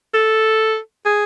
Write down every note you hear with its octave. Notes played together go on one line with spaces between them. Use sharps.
A4
G#4